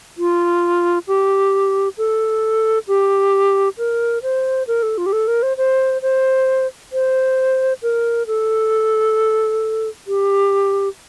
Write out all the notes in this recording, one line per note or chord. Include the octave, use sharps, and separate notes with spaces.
F4
G4
A4
G4
A#4
C5
A#4
A4
F4
G4
A4
A#4
C5
C5
C5
C5
A#4
A4
G4